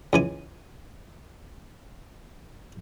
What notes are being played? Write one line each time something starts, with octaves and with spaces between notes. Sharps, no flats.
C#2 E3 G#5